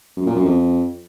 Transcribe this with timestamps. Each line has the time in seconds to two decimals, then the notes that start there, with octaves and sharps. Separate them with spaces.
0.17 F#2
0.26 A#2
0.35 F#2
0.45 F2